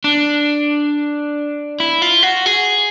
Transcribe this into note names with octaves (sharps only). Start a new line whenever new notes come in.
D4
E4
F4
F#4
G#4